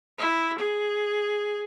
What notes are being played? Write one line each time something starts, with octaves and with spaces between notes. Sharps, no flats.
E4
G#4